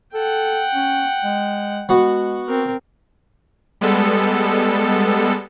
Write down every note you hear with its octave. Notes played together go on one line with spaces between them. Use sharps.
A4 F#5 G5
C#4
G#3
G#3 B3 F#4
C4 A#4
G3 G#3 B3 A4